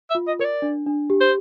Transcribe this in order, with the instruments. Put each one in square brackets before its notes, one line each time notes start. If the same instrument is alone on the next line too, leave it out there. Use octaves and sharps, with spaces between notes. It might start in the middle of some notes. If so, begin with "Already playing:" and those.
[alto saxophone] E5
[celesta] F4
[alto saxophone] D#5
[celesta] A#4 [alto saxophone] C#5
[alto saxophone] D5
[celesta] D4
D4
G4
[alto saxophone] C5